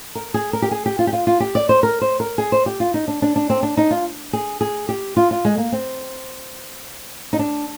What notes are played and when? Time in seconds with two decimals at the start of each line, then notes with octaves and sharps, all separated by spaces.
0.15 A#4
0.34 G#4
0.53 A#4
0.62 G4
0.71 G#4
0.86 G4
0.99 F4
1.07 G4
1.13 F4
1.27 F4
1.40 G4
1.55 D5
1.69 C5
1.83 A#4
2.01 C5
2.20 A#4
2.38 G#4
2.52 C5
2.66 G4
2.80 F4
2.94 D#4
3.08 D4
3.22 D4
3.36 D4
3.50 C4
3.63 D4
3.77 D#4
3.91 F4
4.33 G#4
4.61 G#4
4.89 G4
5.17 F4
5.31 F4
5.45 G#3
5.58 A#3
5.72 C4
7.33 D#4
7.39 D4